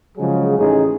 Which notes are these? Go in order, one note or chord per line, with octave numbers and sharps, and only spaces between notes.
C#3 F3 F#3 G#3 G#4
A1 C#4 D#4 G#4